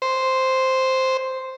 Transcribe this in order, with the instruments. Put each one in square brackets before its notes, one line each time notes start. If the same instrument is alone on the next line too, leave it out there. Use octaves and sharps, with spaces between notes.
[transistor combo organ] C5